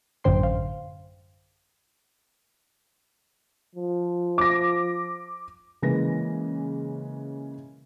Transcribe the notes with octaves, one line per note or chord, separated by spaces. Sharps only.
A1 F#2 D3 C5 G5 C6
F5
F3
D6 A#6
C#3 E3 G#3 A#3 B4 A#6